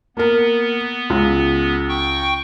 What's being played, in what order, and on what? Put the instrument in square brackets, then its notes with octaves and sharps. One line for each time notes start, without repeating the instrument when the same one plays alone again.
[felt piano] A#3 A#4 [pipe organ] B3
[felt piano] C#2
[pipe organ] G5 C#6